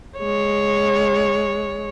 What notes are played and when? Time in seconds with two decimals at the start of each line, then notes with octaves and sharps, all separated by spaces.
0.19 G#3 C#5